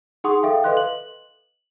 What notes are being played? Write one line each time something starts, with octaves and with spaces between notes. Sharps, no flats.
D#4 G#4 F#5 C6 C#6 D#6
A4 E5 F5 G5
A4 B4 D#5 F5 C6 F#6
F#7